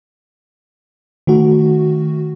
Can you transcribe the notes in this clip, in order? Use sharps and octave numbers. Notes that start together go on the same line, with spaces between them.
D#3 A3 F#4